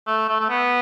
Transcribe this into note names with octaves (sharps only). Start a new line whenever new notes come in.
A3
A3
A3
B3